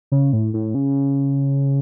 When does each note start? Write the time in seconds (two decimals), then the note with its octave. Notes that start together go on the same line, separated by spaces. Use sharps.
0.12 C#3
0.33 A2
0.54 A2
0.75 C#3